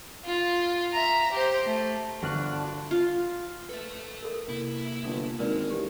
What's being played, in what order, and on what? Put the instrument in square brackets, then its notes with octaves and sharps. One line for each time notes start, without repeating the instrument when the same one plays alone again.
[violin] F4
E5 A#5
G4 C5
A3
[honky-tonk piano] G1 [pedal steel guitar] D4 [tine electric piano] F#4 F6 F#6
[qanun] F4
[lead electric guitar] A4 E5 [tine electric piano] B4
[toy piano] A4 A#4
[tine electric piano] C3 A#3 [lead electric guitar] E4 E5
[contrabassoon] G1 [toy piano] D#6
[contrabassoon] G#1 [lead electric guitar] G#3 [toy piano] A#4 B4 D5
[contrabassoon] A1 [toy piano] G4